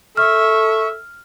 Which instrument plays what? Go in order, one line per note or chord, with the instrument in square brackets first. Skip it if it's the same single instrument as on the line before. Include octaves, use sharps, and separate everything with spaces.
[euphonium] A4 [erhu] E5 [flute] C#6 [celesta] F6